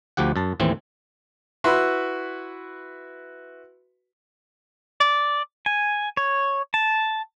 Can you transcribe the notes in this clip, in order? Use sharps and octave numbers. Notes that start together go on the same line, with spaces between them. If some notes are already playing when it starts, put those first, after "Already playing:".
D2 F3 G4 F#5
F#2 A5
D#2 A2 E3 C4
E4 F#4 B4 E5 B5 C6
D5
G#5
C#5
A5